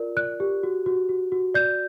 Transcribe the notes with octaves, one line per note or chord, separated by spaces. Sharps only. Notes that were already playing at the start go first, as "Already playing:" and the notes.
Already playing: F4 A#4 D5
D5 F#6
G4
F#4
F#4
F#4
F#4
D5 G6